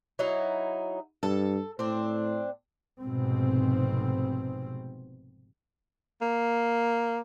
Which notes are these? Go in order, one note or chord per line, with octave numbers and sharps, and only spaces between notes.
F#3 D#4 E4
G2 A4
A2 C4 D4
F1 G#2 B2 C4
A#3